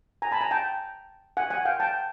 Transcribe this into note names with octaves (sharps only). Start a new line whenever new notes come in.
G#5 A#5
A5 B5
G#5 A#5
G5 A5
F#5 G#5
F#5 G#5
F5 G5
G5 A5